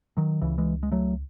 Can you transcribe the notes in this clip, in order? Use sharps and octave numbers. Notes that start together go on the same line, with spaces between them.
D#3 F#3
C#2 C#3 E3
E3 G#3
G#3
F#3 A3